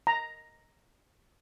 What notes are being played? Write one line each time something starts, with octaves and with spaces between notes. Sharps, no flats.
A#5